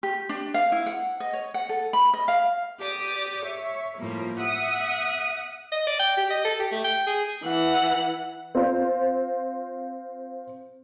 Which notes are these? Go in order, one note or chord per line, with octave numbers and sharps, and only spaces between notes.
G4
D4
F5
E4
F#5
D#5
C#5
F#5
A4
B5
D#5
F5
G4 D5 D6 D#6
C#5 E5
A2 F3 G3 A#3
E5 F#5 D#6
D#5
D5
G5
G4
D#5
A4
G4
A3
G5
G#4
E3 F#5
C4 F4 C5